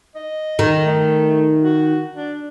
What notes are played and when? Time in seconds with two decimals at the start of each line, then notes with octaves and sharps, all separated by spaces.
0.15 D#5
0.59 D#3
0.85 A3
1.62 F#4
2.13 D4